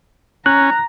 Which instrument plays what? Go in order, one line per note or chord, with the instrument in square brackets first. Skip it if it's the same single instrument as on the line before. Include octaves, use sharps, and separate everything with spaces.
[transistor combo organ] C#4 [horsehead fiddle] A#5 [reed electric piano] F#6